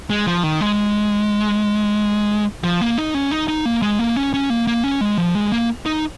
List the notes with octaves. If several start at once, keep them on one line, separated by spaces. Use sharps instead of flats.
G#3
F3
D#3
G#3
F3
A#3
D#4
C#4
D#4
D#4
A#3
G#3
A#3
C#4
C#4
A#3
A#3
C#4
G#3
F3
G#3
A#3
D#4